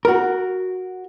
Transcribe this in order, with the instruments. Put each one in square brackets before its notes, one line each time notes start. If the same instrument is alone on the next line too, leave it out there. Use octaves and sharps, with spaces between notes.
[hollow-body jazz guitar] F#4 A#4